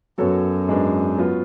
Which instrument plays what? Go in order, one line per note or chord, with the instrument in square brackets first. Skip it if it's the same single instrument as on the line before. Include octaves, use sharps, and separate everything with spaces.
[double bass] F#2 [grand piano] F#3 B3 F#4 A4 C#5
[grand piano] G#2 G#3 B3 D4
F#3 B3 F4